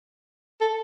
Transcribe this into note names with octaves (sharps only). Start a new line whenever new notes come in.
A4